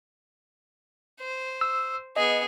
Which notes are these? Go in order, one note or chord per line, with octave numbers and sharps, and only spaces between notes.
C5
E6
B3 G#4 D#5